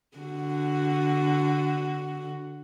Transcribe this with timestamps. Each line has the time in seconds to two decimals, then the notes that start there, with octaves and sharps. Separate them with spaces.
0.18 D3 F#4